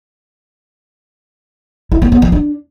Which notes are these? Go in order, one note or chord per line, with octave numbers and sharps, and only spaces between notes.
E4
A#3
B3
F3
D4